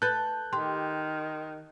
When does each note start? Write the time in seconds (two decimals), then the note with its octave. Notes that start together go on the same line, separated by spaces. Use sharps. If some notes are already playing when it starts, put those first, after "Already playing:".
0.02 A4 B4 F#6 G6 A6
0.53 D#3 G4 C6